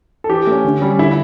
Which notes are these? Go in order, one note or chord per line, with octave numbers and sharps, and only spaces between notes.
A4
E3 G4
A3 C#4
D3
G3 C#4
D3 E4